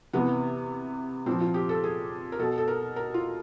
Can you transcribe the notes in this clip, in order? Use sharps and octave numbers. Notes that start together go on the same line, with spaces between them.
C3 E3 B3
A#2 F3 C4
F4
G4
A4
G#4
A#4
B2 A4
A4
A#4
A#4
F4